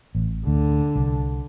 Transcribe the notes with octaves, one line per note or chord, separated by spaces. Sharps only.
A1
D2 D3
C2